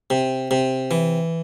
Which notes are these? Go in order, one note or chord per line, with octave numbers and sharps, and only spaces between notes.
C3
C3
E3